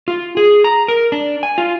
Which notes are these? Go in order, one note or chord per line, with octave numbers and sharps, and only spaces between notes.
F4
G#4
A#5
A#4
D4
G#5
F4